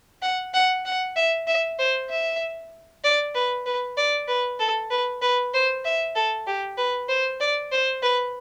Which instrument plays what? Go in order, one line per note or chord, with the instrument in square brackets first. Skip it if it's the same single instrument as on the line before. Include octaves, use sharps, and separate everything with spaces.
[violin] F#5
F#5
F#5
E5
E5
C5
E5
D5
B4
B4
D5
B4
A4
B4
B4
C5
E5
A4
G4
B4
C5
D5
C5
B4